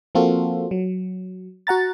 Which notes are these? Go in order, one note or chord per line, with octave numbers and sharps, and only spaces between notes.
F3 A#3 C4 F4 F#4 A4
F#3
F#4 F#5 A#5 A6